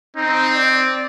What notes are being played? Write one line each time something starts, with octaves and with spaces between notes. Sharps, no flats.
C4 D#4
D5